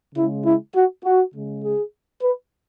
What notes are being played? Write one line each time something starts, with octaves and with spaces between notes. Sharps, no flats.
C#3 G#3 E4
E4
F#4
F#4
C#3 G#3
G#4
B4